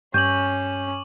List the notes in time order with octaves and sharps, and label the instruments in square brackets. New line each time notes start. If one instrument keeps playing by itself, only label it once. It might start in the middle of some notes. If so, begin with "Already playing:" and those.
[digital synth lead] G2 [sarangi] C#4 [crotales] C#6 D6 F#7 [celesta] G6